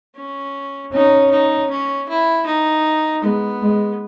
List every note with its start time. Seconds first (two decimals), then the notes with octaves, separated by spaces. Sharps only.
0.15 C#4
0.92 C#4 D#4
1.30 D#4
1.70 C#4
2.08 E4
2.46 D#4
3.23 G#3 B3
3.62 G#3